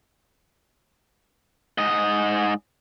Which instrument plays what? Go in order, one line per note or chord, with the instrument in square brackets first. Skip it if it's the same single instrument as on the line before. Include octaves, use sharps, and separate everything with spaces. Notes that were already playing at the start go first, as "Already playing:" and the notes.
[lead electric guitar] G#2 D#5